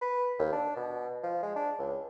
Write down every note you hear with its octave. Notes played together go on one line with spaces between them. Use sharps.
B4
D#2
D4
B2
F3
G#3
D4
C#2